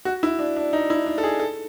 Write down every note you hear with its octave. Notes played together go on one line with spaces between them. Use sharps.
F#4
E4
D4
D4
D#4
E4
D4
A4
G#4
A4